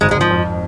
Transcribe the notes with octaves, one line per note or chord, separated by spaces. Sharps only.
G#1 G#3
G#3
G#1 F3
F2